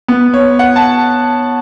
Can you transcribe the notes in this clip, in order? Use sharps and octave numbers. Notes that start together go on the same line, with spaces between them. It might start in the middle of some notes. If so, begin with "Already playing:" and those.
B3
C#5
F#5
A5